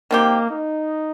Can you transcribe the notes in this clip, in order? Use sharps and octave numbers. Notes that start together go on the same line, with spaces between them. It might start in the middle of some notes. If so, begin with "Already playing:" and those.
D#3 A#3 C4 G4
D#4